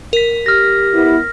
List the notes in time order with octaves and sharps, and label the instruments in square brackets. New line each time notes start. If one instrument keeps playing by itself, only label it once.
[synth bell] A#4 B6
[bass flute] G4 [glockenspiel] F6 A#6
[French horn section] B3 E4